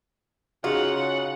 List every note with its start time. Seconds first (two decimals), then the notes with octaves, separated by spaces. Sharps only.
0.64 C#3 D#4 F4 F#4 G#4 F#5